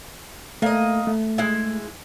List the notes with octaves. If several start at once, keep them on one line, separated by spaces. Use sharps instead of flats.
A3 A#3 D#5
A3
G#3 E4